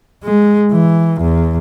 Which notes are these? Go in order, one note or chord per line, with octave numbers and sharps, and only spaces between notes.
G#3
E3
E2